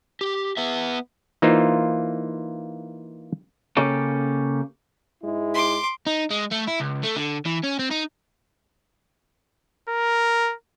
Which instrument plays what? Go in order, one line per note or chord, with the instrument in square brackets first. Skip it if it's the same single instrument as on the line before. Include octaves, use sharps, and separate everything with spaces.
[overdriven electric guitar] G4
B3 E5
[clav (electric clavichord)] E3 A#3 D#4 F4 C5
[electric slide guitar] C#3 A#3 C#4 G4 A4
[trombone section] G#2 G#3 E4
[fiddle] C6 D6
[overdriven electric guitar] D#4
G#3
A3
E4
C#2
A3
D3
E3
C#4
C4
D#4
[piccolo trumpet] A#4